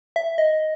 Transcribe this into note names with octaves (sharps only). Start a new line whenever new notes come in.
E5
D#5